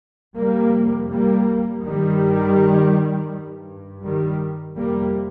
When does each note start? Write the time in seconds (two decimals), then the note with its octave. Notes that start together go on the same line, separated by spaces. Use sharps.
0.37 F2 C3 G3 A#3
1.10 G3 A#3
1.83 G2 D#3 G3
3.30 G2
4.03 D#3 G3
4.76 F2 C3 G3 A#3